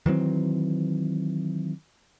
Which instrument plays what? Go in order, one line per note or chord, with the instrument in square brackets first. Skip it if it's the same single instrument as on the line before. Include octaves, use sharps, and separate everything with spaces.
[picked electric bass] D#3 E3 F#3 C4